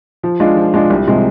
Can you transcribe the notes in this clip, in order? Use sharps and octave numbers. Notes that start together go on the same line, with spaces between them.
F3
G#3 D4 F4
F3
G#3 D4 F4
C2
C3 F3 G#3